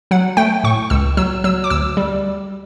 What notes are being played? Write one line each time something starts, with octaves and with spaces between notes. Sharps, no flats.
F#3 F#5
A3 G5
A2 C#6
C#2 E6
F#3 E6
F#3 E6
D6
D2 E6
G3